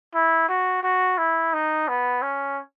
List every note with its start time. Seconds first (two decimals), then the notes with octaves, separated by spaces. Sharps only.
0.15 E4
0.49 F#4
0.83 F#4
1.18 E4
1.54 D#4
1.88 B3
2.22 C#4